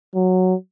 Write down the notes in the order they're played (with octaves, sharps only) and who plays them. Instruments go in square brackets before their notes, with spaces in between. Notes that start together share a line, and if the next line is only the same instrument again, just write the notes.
[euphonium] F#3